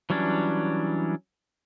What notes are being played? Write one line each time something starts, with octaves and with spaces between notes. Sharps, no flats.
E3 F#3 G3 C#4 D4